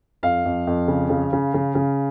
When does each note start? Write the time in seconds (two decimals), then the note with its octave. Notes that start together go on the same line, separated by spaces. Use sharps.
0.23 F2 F5
0.45 F2
0.67 F2
0.88 C#3
1.10 C#3
1.33 C#3
1.54 C#3
1.75 C#3